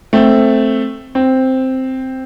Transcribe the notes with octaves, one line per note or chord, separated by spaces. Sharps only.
A3 C4
C4